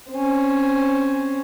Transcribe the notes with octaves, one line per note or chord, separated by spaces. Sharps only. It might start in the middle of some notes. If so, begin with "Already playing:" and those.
C4 C#4